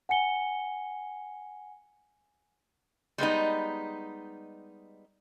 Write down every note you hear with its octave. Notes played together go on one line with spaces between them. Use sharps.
F#5 G#5 C#7 G7
G3 G#3 B3 D#4